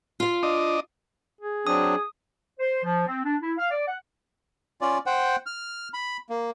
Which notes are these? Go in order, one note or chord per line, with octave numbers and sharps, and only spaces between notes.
F4 F5
D4 D#5
G#4
F#3 C4 D4 D#6
C5
F3
C4
D4
E4
F5
D5
F#5
C#4 F4 D5
C5 F#5 G5
F6
B5
A#3